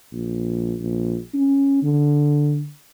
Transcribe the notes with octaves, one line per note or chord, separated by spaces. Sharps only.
A#1
A#1
C#4
D3